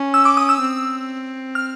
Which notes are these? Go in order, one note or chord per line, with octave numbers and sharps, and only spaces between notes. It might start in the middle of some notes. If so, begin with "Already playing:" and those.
Already playing: C#4
E6
D6
D#6
E6
C4
F6